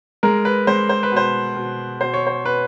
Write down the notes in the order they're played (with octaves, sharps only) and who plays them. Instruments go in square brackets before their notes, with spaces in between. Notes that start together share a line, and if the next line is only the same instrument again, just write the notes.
[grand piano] G#3 A#4
B4
G#3 C5
C5
B4
B2 C5
B2
B2 C5
C#5
C5
B2 B4